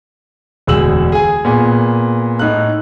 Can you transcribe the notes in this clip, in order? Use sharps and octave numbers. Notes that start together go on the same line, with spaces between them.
E1 D2 G#4 E6 F#7
G#4 G#5
A#2 B3 G#4
A2 D#4 A4 F#6